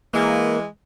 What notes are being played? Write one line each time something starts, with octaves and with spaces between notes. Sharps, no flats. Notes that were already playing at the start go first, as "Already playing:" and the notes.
E3 G#3 A#3